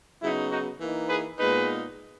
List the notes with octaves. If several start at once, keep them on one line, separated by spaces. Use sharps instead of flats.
C#3 F#3 B3 D#4 E4
D#4 F#4
E3 A#3 D#4
G#4 B4
A#2 G#3 B3 D#4 G#4 B4